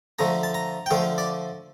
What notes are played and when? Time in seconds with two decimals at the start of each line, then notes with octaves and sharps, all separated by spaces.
0.19 D3 F3 A3 A#5
0.43 A5
0.54 A#5
0.86 G5
0.91 D3 F3 A3 F5
1.18 D5